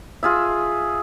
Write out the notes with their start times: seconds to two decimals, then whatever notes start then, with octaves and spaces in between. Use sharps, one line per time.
0.23 F4 G#4 E5